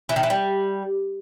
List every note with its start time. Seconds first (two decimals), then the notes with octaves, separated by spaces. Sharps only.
0.09 E3
0.16 D#3
0.23 E3
0.30 G3